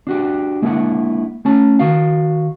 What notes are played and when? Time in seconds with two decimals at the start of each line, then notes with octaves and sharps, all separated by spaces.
0.07 D4 F#4 G4
0.62 G#3 A#3 D4 E4 F#5
1.45 A3 C#4 A5
1.79 D#3 F#4 F5